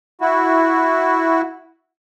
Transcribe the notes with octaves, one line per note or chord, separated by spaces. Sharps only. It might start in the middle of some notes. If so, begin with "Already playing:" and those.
E4 F#4